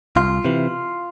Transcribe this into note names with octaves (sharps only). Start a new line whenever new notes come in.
C2 F4
C3 E3